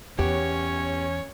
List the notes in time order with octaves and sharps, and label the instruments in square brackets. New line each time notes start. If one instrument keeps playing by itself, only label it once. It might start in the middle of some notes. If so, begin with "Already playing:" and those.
[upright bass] E2 [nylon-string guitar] B3 G4 [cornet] C#4 [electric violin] C#5